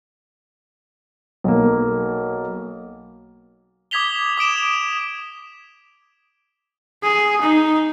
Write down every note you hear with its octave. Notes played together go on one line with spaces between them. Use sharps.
B1 A#3
D6 D#6 G#6 B6 F7 G7
D6 D#6 D7 E7
G#4
D#4